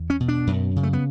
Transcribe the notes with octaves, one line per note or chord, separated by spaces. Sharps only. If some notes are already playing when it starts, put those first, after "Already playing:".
Already playing: E2
C#4
B2
D4
F#2
C#3
A3
B3